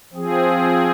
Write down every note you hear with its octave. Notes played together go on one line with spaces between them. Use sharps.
F3 C4 G#4